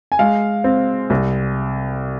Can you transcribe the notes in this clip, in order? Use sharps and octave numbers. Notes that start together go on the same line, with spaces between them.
G#5
G#3 F5
C4
C2